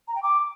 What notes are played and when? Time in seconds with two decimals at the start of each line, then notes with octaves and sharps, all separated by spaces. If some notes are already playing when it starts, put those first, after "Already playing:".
0.08 A#5
0.15 G5
0.23 D6